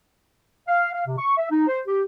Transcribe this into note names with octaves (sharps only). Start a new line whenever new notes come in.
F5
F5
C3
C#6
E5
D#4
C5
G4